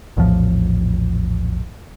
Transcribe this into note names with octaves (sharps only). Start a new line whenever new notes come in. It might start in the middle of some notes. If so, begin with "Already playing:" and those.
A#1 E2 A2 F3